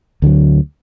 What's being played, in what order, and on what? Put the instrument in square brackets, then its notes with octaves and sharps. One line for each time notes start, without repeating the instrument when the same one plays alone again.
[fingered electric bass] D2 D3 E3 F#3